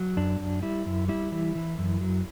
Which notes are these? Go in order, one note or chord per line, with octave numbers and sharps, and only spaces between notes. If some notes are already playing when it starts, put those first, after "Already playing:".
Already playing: F#3
F#2 D4
F#2
G3 E4
F#2
G3 E4
E3
E3
F#2
F#3